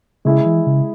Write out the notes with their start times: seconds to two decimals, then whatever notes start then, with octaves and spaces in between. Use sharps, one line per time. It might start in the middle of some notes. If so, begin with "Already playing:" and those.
0.25 C#3 G#3 E4 G#4
0.45 E3
0.66 C#3